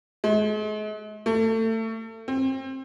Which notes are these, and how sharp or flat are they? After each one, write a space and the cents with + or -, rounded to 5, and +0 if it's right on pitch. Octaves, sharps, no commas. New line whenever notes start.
G#3 +40
A3 +30
C4 +25